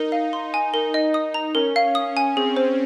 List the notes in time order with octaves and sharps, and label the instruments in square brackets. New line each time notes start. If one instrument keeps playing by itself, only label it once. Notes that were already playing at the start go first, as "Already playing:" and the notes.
Already playing: [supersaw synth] D#4 [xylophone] A#4
[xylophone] F5
C6
G#5
[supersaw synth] D#4 [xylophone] A#4
[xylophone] D#5
D#6
A#5
[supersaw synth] C#4 [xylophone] A#4
[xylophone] F5
D#6
G#5
[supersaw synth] C4 [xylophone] G#4
[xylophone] C5